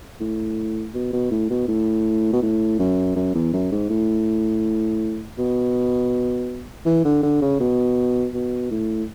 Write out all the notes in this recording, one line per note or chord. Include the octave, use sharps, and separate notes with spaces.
A2
B2
B2
A2
B2
A2
B2
A2
F#2
F#2
E2
F#2
G#2
A2
B2
E3
D3
D3
C#3
B2
B2
A2